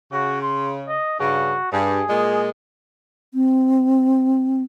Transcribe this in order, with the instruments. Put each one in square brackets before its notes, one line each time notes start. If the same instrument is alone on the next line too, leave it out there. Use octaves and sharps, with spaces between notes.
[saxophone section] C#3 [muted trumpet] F#4
[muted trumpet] C6
D#5
[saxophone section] G2 C#3 [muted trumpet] F#4
[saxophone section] G2 [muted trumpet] G#4
[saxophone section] A#2 G#3
[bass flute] C4